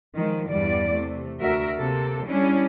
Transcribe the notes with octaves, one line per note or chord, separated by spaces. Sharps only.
D#3 F3 G#3
E2 G2 G3 D5
C3 A3
D2 F#4 A#4 E5
C3 A#3 A4
G3 C#4 D4 E4